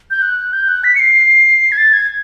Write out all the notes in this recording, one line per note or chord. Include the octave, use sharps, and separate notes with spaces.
G6
F#6
G6
F#6
B6
C#7
C7
G#6
A6
G#6